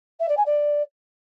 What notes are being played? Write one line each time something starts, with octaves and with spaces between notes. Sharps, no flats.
E5
D5
G#5
D5